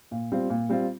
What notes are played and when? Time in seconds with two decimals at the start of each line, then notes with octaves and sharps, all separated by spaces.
0.11 A#2
0.32 G3 C4 F4
0.50 A#2
0.69 G3 C4 F4